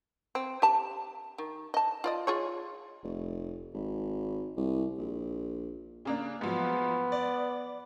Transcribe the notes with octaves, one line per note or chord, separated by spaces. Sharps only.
C4
G4 A5
D#3
D#5 A5
F4 D5 D#5
F4 G#4 C#5
F1
G#1
C2
A#1
C#3 A#3 D4
G#2 F3 F#3 B3
D5